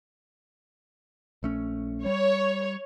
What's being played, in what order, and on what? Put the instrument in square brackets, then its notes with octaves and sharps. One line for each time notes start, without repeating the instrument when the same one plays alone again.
[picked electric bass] A#1 A3 C#4
[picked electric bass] G3 [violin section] C#5